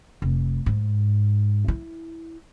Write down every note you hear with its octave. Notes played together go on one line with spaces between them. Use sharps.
F1
G#2
E4